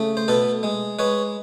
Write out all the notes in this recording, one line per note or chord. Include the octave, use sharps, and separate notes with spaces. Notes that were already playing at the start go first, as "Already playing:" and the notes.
Already playing: C#3 A3
C5
B2 A4 B4
G#3
G#3 B4 C#5